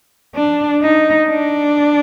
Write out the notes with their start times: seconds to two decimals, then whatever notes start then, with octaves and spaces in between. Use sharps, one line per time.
0.35 D4
0.82 D#4
1.28 D4